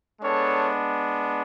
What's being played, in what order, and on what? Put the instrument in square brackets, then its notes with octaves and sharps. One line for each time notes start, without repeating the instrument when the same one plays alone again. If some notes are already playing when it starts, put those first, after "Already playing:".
[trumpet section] G#3 B3 D4 A4 C#5